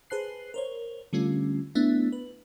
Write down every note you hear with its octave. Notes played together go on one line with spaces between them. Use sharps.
G#4 B4 C5 A5 F#6 C7
A#4 C5 C#5
D3 G3 A3 C#4 F4
A3 B3 D4 E4 E5
B4